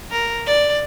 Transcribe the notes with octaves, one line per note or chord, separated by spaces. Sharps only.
A#4
D5